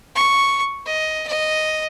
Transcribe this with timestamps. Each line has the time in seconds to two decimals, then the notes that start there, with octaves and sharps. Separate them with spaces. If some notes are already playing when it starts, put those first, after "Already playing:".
0.15 C#6
0.86 D#5
1.27 D#5